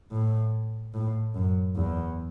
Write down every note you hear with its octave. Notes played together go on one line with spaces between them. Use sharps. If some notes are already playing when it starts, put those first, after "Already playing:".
A2
A2
F#2
E2